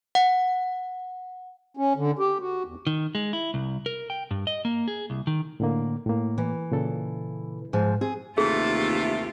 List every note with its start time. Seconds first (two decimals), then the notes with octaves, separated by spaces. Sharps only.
0.15 F#5
1.77 C#4
1.97 D3
2.19 G4
2.40 F#4
2.66 E2
2.87 D#3
3.15 G#3
3.33 E4
3.54 C2
3.86 A#4
4.10 G5
4.31 G2
4.47 D#5
4.65 A#3
4.88 G#4
5.10 C2
5.27 D#3
5.60 A2 D3 A#3
6.06 A2 A#3
6.38 E3
6.72 A#2 C#3 A4
7.73 G#2 F3
8.01 C4 G#4
8.38 D#2 C3 E3 A3 F4 G#4